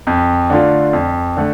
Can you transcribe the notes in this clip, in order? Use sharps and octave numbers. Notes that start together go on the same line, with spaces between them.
F2
D3 A3 D4 F4
F2
D3 A3